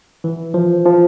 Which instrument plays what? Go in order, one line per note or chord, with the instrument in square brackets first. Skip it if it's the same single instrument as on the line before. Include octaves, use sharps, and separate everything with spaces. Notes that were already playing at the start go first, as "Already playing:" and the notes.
[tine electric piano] E3
F3
F3